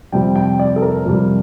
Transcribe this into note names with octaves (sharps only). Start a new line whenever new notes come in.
F2 C3 G3 G5
G5
D5
A4
A#4
F2 C3 G3